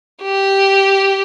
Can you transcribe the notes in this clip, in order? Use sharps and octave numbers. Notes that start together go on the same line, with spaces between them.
G4